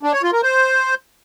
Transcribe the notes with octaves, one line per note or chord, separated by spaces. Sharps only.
D4
C#5
F4
A#4
C5